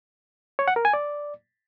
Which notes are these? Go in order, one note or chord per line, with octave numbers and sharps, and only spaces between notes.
C#5
F#5
A#4
G#5
D5